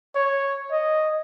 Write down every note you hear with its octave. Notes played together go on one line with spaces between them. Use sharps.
C#5
D#5